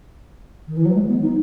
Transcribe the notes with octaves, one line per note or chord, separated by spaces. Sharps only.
D#3
E3
F#3
G#3
B3
D#4